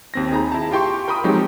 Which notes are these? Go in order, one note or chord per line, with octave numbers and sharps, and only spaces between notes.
D#2 C4 A#6
D#4 G#4 A#5 B5
E4 A5
F4 G4 G5 C6 C#6
A#4 G5 B5 C#6 D#6
F3 F#3 G#3 C4 D#4 G4